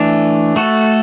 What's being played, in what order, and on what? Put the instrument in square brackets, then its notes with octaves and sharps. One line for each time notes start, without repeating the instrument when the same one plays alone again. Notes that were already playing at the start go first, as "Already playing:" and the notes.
Already playing: [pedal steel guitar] E3 A3 D4
A3 F#4 A4